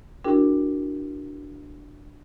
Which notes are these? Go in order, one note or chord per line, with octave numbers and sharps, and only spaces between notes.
D4 E4 F#4 G#4 A#4 G5